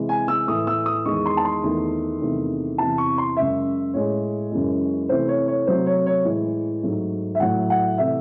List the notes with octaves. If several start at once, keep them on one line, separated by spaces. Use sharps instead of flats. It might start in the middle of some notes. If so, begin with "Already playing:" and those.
Already playing: C3 E3 G#3
G#5
E6
A2 E3 A3 D#6
E6
D#6
E2 D#3 G#3 C#6
C6
A5
C6
E2 D#3 A3
E2 C3 D#3 A3
E2 C3 E3 A5
C#6
C6
F#2 C#3 G#3 E5
A2 G#3 C#5
F#2 C#3 E3 G#3
C3 E3 A3 C5
C#5
C#5
C3 F#3 A3 C5
C#5
C#5
A2 E3 G#3
G#2 F#3 A3
E5
A2 F#3 A3 F#5
F#5
C3 E3 A3 E5